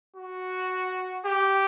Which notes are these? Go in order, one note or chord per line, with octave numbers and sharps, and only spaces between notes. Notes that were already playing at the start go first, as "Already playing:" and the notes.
F#4
G4